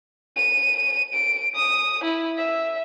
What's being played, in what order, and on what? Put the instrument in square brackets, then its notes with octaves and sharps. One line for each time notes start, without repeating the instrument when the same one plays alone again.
[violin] D#7
D7
D#6
E4
E5